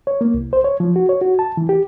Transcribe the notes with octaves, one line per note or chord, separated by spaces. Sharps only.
C#5
A#3
C2
C5
C#5
F3
F#4
C#5
F#4
A5
E3
G4